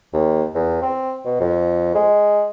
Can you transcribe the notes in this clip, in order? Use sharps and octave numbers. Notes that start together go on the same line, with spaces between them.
D#2
E2
C4
B2
F2
G#3